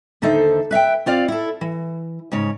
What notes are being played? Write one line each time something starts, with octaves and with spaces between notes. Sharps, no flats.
D#2 D3 D#4 A4 C5 E5
B4 E5 F5 G5
C4 F4 D5 F5
E4 A4
E3
G#2 C#3 C#5